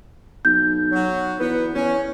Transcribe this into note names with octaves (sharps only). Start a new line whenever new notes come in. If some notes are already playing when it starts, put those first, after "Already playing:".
B1 G6
F#3
E2 B3
E2 C#4